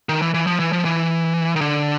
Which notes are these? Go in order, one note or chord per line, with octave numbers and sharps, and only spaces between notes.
D#3
E3
E3
F3
E3
F3
E3
D#3
D3